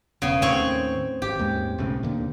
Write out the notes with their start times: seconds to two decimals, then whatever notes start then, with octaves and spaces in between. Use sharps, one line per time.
0.22 E1 C#3 B3
0.42 D#2 A2 C4 C#4 C#5
1.22 G#1 G4
1.39 D#2 G#2 G#3
1.78 B1 A2 C#3
2.03 D#2 A#2 D3